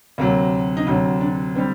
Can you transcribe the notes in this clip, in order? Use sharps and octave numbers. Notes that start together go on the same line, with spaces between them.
D2 C3 F#3 A#3
D#4
D2 C3 F#3 D4
D4
D3 G3 C4